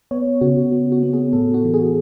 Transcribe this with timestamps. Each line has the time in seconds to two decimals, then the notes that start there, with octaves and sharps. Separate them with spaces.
0.11 B3 C#5
0.41 C#3 F#4
0.72 B3
0.92 F#4
1.03 B3
1.13 G#4
1.33 A2 A4
1.54 F#4
1.64 E3
1.74 G#4